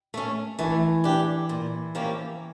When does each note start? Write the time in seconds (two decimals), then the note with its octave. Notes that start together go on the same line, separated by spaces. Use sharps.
0.14 A3 C#4
0.59 E3 A3
1.04 D4 G4
1.49 A#2
1.95 F3 A#3 C#4 G4